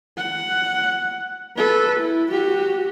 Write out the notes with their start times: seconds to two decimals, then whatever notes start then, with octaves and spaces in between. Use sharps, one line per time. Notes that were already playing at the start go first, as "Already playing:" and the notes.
0.17 F#5
1.57 A4 B4
2.00 E4
2.31 F#4 G4